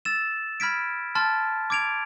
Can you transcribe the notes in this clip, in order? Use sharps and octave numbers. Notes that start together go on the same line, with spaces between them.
E6 A6 E7
B5 F6 G#6 B6 D7
A5 C6 F6 A6
D6 G#6 D7 F7